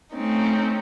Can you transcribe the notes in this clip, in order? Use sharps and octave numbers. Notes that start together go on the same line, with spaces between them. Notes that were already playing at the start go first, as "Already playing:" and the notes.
A3 C4 C#4 D#4